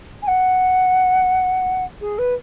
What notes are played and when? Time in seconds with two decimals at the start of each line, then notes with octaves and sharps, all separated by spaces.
0.22 G#5
0.27 F#5
2.01 G#4
2.18 B4